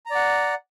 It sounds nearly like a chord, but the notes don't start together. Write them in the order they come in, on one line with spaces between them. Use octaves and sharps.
A#5 D5 F#5